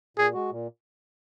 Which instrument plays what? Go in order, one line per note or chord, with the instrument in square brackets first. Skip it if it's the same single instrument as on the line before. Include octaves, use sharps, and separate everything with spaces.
[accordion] A#2 [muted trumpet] G#4
[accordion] G#3 F#4
A#2